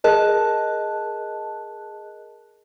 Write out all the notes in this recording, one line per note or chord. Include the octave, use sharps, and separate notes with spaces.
G#4 A#4 D#5 A5 F#6